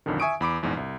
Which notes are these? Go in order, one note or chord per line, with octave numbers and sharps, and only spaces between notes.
B1 F2 D3 D#3
E5 G#5 C#6 D#6 D7
E2 B5 D6 D7
A#1 E2 G#2
C2